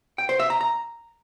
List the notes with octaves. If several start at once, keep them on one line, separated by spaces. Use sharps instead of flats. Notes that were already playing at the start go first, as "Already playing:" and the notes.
G5
C5
E5
A#5
A#5